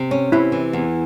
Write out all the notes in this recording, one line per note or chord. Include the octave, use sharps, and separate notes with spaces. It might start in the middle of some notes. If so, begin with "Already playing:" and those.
Already playing: C3
C#4
C3 E4
E3
E2